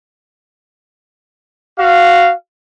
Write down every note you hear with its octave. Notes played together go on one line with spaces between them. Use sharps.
F#4 F5